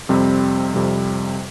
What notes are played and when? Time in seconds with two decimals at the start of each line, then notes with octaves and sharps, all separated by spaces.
0.09 F2 C3 G3 C4
0.74 F2 C3 G3 C4